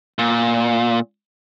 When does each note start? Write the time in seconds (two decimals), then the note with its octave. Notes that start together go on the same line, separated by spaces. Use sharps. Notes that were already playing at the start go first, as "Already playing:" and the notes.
0.19 A#2